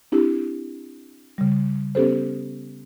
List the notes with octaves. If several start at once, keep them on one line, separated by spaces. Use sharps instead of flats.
C4 D4 E4 G4
C#3 G3
B3 C#4 G4 A4 C5